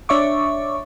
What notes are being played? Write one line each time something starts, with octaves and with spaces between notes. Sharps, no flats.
D4 C#5 E5 C#6 D6